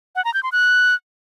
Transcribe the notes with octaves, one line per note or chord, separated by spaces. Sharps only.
F#5
A#5
G6
C6
F#6